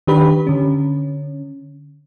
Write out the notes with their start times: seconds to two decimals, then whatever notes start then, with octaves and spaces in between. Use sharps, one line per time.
0.07 D#3 D4 G4 B4 B5
0.47 D3 C#4